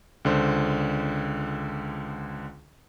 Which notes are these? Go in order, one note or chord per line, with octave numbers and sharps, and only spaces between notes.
C#2 D3 C5